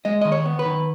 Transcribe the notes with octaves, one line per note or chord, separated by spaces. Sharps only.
G#3 D#5
D#3 D#5
C#5
B3
B4
D#3